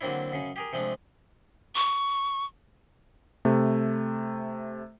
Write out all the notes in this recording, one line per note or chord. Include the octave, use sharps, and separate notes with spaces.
D3 F#3 A#3 C4 D4 E4
F#2 C#3
G4 G#4 A#4
C3 F3 G#3 A3 D4
C#6
C3 A3